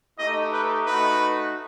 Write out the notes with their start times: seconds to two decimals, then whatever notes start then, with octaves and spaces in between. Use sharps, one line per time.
0.18 A3 D#4 G4 D#5
0.52 B4
0.86 A3 D#4 F#4 B4